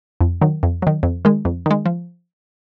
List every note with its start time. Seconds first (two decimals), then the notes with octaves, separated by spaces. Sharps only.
0.21 F2
0.41 D#3 F#3
0.63 F2
0.82 D#3 F#3
1.03 F2
1.25 D#3 G#3
1.45 F2
1.66 D#3 G#3
1.86 F3